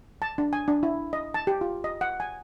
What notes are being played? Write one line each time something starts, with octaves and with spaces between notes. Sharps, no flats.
A5
D4
G#5
D4
E4
D#5
A5
G4
F4
D#5
F#5
G#5